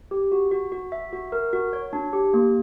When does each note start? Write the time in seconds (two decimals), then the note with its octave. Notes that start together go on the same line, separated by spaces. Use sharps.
0.11 G4
0.32 F#4
0.51 F#4
0.72 F#4
0.92 E5
1.13 F#4
1.32 A#4
1.53 F#4
1.73 C#5
1.93 D4
2.13 G4
2.34 A#3